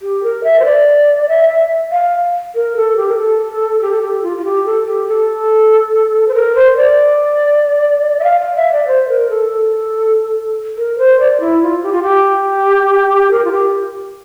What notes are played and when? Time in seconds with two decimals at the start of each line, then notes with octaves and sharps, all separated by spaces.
0.02 G4
0.23 A#4
0.44 E5
0.60 C5
0.65 D5
1.29 E5
1.49 E5
1.92 F5
2.55 A#4
2.76 A4
2.96 G4
3.09 A#4
3.18 A4
3.81 G4
3.92 A4
4.02 G4
4.23 F4
4.37 F4
4.45 G4
4.66 A4
4.86 G4
5.08 A4
6.28 C5
6.34 A#4
6.55 C5
6.77 D5
8.19 E5
8.24 F5
8.41 F5
8.56 E5
8.72 D5
8.87 C5
9.09 A#4
9.30 A4
10.78 A#4
10.98 C5
11.20 D5
11.40 E4
11.62 F4
11.83 G4
11.92 F4
12.03 G4
13.31 A#4
13.45 F4
13.51 G4